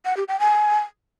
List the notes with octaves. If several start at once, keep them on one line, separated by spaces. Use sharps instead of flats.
F#5
G4
G5
G#5